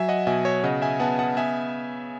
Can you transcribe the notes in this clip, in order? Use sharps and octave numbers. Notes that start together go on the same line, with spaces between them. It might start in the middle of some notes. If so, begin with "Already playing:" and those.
Already playing: F#3 E5 G#5
D#5 F#5
B2 E5 G#5
C#5 E5
C#3 D#5 F#5
E5 G#5
B3 F#5 A5
F#5 A5
B3 E5 G#5